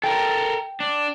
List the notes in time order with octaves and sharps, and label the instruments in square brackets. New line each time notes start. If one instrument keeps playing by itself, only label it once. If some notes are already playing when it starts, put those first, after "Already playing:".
[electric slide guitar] A4 A#4 [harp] G5
[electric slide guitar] D4